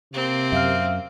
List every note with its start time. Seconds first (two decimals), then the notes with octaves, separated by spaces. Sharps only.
0.13 C3 A#3 C4
0.52 F#2 E5 F5 F6